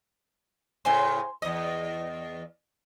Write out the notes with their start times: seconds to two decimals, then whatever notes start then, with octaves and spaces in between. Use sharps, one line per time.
0.85 A2 C#3 C5 G#5 C6
1.42 E2 D#5 D#6